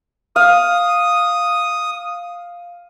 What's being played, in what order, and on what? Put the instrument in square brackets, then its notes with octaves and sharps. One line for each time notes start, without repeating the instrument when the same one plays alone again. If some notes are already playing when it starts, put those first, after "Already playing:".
[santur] F5 [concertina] D#6